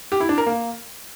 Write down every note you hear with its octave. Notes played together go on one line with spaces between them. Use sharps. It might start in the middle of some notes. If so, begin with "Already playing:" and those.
G4
E4
D4
A#4
A#3